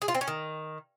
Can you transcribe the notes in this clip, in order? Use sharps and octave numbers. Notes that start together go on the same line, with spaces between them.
G#4
F4
C4
C#4
D#3